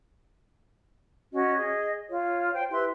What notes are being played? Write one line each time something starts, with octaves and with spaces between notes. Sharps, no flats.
C#4 F#4 D#5
G#4 D#5
F4 C#5
C5 G5
E4 G4 B4 C6